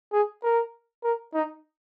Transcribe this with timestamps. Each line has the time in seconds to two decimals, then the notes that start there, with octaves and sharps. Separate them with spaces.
0.13 G#4
0.43 A#4
1.04 A#4
1.34 D#4